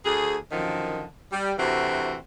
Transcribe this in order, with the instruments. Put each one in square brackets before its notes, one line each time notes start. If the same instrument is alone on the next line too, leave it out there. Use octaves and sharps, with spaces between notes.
[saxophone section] D2 G#4
F#2 D3 D#3 F3
G3
D2 C3 E3 C4 F#4